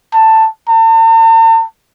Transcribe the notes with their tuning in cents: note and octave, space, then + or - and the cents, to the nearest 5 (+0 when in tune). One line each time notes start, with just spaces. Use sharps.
A5 +10
A5 +45